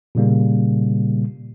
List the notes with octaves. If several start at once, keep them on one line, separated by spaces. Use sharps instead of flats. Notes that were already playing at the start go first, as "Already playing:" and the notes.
A#2 C#3 G3 A#3